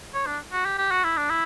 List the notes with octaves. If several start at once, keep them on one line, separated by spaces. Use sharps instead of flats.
C#5
D4
F#4
G4
G4
F#4
E4
D4
E4